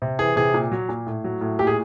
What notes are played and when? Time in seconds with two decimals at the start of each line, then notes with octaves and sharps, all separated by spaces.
0.02 C3
0.19 E3 G#4
0.36 C3 G#4
0.54 A#2
0.72 F#3
0.89 A#2
1.07 A2
1.24 F#3
1.41 A2
1.59 A#2 G4
1.67 G#4